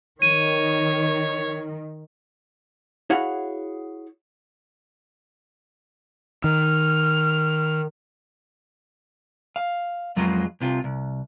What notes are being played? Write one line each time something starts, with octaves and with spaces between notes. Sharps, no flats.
D#3 C#5 D#7
E4 F#4 G#4 C#5 F5 F#5
D#3 F6
F5
F2 F#3 G#3 F4
C2 C3 F4
C2